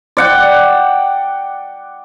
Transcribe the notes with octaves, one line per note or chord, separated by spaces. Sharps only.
D5 F#5 G5